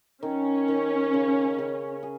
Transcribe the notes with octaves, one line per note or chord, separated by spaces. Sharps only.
D#3 C#4
D#3
C#3
C#3
G#4